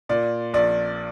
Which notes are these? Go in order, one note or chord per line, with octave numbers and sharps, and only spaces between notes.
A#2 D5
A#1 D5